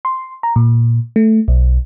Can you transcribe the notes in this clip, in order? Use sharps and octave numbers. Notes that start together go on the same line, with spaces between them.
C6
A#5
A#2
A3
B1